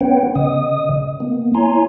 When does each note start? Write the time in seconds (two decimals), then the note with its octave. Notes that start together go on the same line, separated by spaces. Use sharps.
0.01 B3 C#4 B4 C#5 F#5 G5
0.35 C#3 D#5 D#6
1.20 A#3 B3
1.54 E4 C#5 G#5 A#5 C6